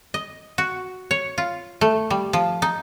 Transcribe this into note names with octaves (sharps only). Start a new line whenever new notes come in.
D#5
F#4
C#5
F4
A3
G3
F3
D#4